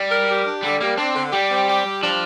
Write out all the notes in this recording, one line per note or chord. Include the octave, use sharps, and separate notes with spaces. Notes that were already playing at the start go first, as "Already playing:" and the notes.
Already playing: G3
A#4
G4
D4
D3 G3
G3 A#3
C4 D4
D3
G3 G4
C4
G4
G3
F3 D4